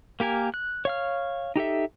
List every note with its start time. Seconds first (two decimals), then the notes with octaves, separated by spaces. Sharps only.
0.20 A#3 G4 A#4 G#5
0.54 F#6
0.85 C#5 F5 F6
1.56 D#4 G4 A4 E5